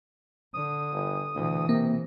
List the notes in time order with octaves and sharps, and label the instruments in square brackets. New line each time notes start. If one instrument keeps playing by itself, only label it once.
[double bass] D3 [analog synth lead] D#6
[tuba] G1
[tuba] D2 [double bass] B2 E3
[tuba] C3 [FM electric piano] A#3